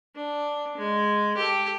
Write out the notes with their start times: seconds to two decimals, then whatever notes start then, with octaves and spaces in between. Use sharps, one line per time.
0.15 D4
0.77 G#3
1.37 G4 A4